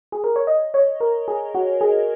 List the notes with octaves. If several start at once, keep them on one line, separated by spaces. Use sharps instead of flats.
G#4
A#4
C#5
D#5
C#5
A#4
G#4
F#4
G#4